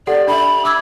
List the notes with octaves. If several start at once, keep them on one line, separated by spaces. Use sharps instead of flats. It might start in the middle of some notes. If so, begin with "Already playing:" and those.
G4 A4 D5 F#5
D4 E5 B5
F7
D6 E6 G#6